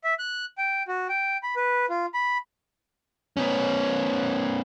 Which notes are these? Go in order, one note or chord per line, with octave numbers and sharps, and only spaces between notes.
E5
F#6
G5
F#4
G5
B5
B4
F4
B5
B3 C#4